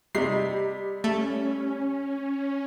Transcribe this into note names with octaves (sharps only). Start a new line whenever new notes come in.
C3 G3 D#4 C7
A3 C#4